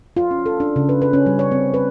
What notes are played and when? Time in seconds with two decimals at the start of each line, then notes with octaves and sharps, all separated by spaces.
0.17 F4
0.31 C#4
0.46 A4
0.60 D4
0.76 C#3
0.89 B4
1.02 B4
1.13 C#4
1.26 G3
1.39 C#5
1.52 C4
1.74 B4